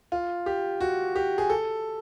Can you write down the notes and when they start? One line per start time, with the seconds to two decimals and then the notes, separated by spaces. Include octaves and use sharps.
0.12 F4
0.46 G4
0.81 F#4
1.16 G4
1.38 G#4
1.50 A4